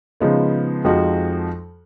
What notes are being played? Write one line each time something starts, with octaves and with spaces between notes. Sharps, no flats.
C#3 F3 G#3 B3 D#4
F2 F3 G#3 D#4 F#4